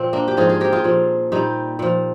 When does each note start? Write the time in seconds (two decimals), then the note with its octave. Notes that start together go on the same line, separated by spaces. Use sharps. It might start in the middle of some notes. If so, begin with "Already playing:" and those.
Already playing: A#2 F3 C4
0.13 A#3 D4
0.28 G4
0.37 G#2 F3 F4 G#4
0.49 F4 G#4
0.60 G4 A#4
0.72 F4 G#4
0.84 A#2 F3
1.32 A#2 G3 D#4 G4
1.79 A#2 F3